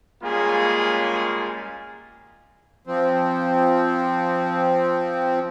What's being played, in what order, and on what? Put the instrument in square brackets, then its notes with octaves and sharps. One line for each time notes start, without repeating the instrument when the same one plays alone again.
[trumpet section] G3 G#3 A#3 C#4 F4 G#4
[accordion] F3 C4